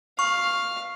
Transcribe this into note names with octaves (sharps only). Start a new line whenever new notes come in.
F5 C#6